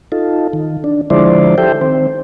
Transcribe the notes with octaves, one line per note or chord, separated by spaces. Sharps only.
D#4 F4 A4
D#3
D4
D3 F3 G#3 E4 C5 D5
G4 A4 C5 E5 G5
D#3 C4 C5